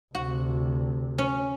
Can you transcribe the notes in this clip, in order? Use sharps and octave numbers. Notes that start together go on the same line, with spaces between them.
D2 C3 F#4
C#4